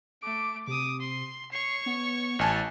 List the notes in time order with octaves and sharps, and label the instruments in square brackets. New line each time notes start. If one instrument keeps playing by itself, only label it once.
[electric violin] A3 D7 [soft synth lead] D6
[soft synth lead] C3 [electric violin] D6 D#6
[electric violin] C6
[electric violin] C#5 C#6 [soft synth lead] C7
[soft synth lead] B3
[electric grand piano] A1 G#5 A5